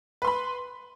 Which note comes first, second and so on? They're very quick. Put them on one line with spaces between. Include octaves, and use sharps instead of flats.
B4 C6 B5